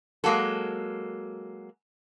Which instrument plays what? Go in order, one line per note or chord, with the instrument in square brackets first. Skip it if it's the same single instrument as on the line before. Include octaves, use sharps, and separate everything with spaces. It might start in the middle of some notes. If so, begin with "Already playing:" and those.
[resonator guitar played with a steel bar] F#3 G#3 A#3 F#4 A4